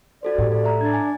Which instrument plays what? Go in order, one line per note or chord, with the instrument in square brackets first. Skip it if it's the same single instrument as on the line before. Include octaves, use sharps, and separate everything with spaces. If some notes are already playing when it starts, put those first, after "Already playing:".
[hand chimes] F#4 A4 C5 [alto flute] D5
[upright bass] A2 [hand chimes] G4
[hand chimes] A4 [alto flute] D5
[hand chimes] E5 A#5
[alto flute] D4 [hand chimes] G#6 A6
[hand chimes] G#5